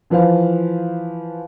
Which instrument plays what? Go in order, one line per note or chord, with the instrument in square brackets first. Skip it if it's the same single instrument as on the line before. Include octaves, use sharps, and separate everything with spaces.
[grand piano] E3 F3 B4 C5 F5